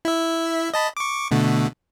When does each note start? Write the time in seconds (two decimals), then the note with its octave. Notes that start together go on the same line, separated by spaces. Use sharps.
0.05 E4 E5
0.74 D#5 A5 B5
0.97 C#6 D6
1.31 B2 D3 A3